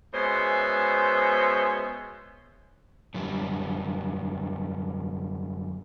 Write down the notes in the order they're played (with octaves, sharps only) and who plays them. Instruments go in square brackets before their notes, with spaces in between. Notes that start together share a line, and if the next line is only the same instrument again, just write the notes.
[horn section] B2 G#3 C#4 C5 E5
[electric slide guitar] F#2 D3 G3